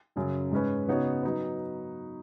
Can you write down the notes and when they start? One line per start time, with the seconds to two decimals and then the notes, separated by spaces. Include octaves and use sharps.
0.16 F#2 C#3 F#3
0.52 G#2 G#3 C#4 B4
0.88 C#3 B3 D#4 F#4 C#5
1.23 F#3 D#4 B4